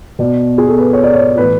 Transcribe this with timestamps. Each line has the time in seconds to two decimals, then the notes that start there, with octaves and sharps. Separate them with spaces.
0.19 B2 D5
0.58 G#4
0.68 A4
0.78 B4
0.93 C#5
1.03 D5
1.13 C#5
1.37 A2 E3 B4